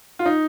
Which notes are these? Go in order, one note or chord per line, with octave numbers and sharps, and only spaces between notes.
F4
D#4